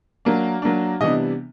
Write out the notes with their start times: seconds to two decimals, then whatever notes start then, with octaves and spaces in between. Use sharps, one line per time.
0.25 F#3 A#3 D4
0.62 F#3 A#3 D4
1.01 C3 E3 G3 B3 D4 D#5